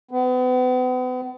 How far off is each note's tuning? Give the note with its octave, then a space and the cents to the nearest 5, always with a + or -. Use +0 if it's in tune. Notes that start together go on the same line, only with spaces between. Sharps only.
B3 +40